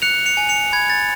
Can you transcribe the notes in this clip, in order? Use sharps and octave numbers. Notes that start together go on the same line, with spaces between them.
F#6 C#7 F7
C#7 F7
G#5
C#7 F7
B5 G#6
A6